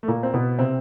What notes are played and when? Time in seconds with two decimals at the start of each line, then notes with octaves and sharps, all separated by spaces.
0.03 A3
0.08 A#2 A#3
0.23 C4
0.34 B2 B3
0.59 C3 C4